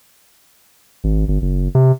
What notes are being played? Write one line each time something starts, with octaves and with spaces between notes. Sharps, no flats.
G#1
G1
F#1
C3